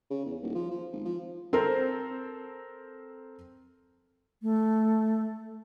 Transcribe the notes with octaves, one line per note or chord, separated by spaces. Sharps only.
C#3
E2
D#1
F3
F3
G#1
F3
C4 A4 A#4 C5
A3